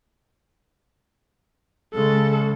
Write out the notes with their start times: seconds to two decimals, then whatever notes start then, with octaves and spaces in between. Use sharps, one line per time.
1.94 C#3 G#3 A4